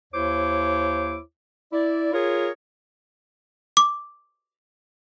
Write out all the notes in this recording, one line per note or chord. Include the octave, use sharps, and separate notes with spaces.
D#2 E4 C5 C#5 D6
E4 D5
F4 G#4 A#4 C#5
D6